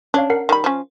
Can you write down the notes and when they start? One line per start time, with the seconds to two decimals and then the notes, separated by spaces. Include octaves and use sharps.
0.14 C#4 D4 C#5 F5
0.30 A#4 F#5 C7
0.49 D#3 G3 B5
0.64 F3 C#4